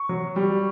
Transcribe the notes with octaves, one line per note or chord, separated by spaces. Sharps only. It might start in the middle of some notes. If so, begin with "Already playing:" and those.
Already playing: C#6
F#3
G3